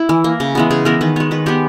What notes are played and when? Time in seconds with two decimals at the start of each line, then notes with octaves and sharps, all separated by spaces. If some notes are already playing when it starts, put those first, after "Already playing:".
Already playing: E4
0.09 E3
0.24 A#3
0.40 C#3
0.55 E3 G#3 B3
0.70 C#3 G#4
0.85 E3 G#3 B3 A#4
1.01 D#3 B4
1.16 G#3 B3 C#5
1.31 D#3 B4
1.46 G#3 B3 G4